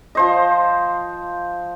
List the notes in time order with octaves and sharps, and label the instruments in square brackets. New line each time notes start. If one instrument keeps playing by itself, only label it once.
[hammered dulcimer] F3 C5 D#5